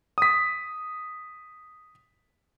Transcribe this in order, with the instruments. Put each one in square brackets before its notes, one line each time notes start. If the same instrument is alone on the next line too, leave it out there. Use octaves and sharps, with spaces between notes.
[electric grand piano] D#6 B6